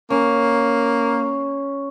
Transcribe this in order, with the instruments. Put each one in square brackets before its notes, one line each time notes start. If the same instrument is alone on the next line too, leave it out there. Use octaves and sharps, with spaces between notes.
[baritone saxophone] A#3 [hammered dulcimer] C#4